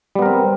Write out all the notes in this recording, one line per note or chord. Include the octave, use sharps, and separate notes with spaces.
G3 B3 C4 A#4